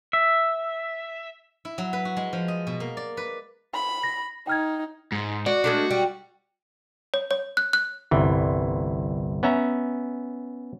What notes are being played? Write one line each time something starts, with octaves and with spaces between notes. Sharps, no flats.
E5
E4
F#3
B4
F#4
G#3
F3
D#5
B2
A#3
D5
B4
B5
A#6
D#4 G5 F6 G#6
G#2
F#4 D5
G#3 A3 D4
G3
C#5
C#5
F#6
F#6
G1 C2 E3
B3 C#4 E5 A#5